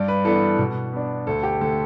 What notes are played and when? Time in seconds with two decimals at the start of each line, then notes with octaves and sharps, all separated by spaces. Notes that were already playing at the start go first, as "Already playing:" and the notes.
Already playing: G2 D5
0.08 B4
0.24 E3 B3 D4 A4
0.58 B2
0.93 B3 D4
1.27 D2 A4
1.43 G4
1.61 D3 A3 A4